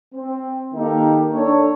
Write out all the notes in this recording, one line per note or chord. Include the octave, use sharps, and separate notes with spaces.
C4
D#3 A#3 D#4 G4 A4 A#4
D4 A4 C#5